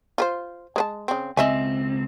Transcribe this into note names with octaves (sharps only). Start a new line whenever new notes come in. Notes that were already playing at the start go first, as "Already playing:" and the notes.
F4 B4 C5
G#3 B4 A5
C#3 C4
C#2 C4 D#5 E5 G#5